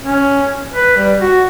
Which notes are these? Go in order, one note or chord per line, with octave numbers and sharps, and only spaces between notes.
C#4
B4
G3
F#4